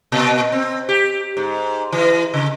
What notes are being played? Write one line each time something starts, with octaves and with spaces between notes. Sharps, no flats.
A#2
C4
G4
G#2
E3
C#3